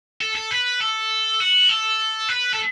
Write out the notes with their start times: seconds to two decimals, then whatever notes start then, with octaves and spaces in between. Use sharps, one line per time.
0.21 A4
0.35 A4
0.51 B4
0.80 A4
1.40 F#4
1.69 A4
2.29 B4
2.54 A4